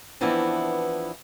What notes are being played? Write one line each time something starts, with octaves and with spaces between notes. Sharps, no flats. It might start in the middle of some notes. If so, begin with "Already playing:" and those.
E3 F3 B3 C4 D4 E4